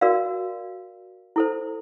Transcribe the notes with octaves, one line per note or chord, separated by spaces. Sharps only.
F#4 A#4 D5 F5
E4 A4 C5